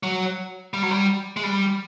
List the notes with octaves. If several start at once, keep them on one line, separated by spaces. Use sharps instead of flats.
F#3
G3
F#3
G3
G#3
G3